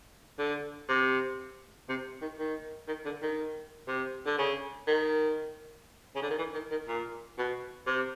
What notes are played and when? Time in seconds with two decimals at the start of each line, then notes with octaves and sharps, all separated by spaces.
0.39 D3
0.88 C3
1.89 C3
2.21 D#3
2.39 D#3
2.87 D#3
3.05 D3
3.22 D#3
3.87 C3
4.26 D3
4.38 C#3
4.87 D#3
6.15 C#3
6.22 D3
6.30 D#3
6.38 E3
6.53 D#3
6.71 D#3
6.88 A#2
7.38 B2
7.87 C3